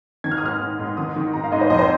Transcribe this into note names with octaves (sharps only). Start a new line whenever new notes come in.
D#3 G#6
F6
D#6
G#2 F6
G#2
G#2
D#3 D#6
D#3
G#2 A#5
F5
G#2 D#5
C5
F2 D#5
C5